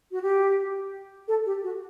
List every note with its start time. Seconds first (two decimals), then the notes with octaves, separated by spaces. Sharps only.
0.12 F#4
0.22 G4
1.28 A4
1.46 G4
1.63 F#4